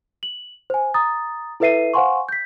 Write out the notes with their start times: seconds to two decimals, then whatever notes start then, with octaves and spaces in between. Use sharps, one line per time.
0.23 F#7
0.70 C5 G#5
0.94 A#5 D#6 A6
1.60 E4 A4 B4 E5 C7 D#7
1.94 C5 F5 F#5 G#5 C6 C#6
2.29 G6 B6